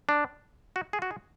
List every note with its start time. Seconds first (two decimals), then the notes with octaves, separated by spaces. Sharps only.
0.09 D4
0.76 F#4
0.93 G#4
1.02 F#4
1.11 G#4